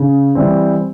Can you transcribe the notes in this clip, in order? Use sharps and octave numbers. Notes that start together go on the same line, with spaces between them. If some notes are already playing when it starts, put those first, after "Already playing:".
Already playing: C#3
E3 G3 C4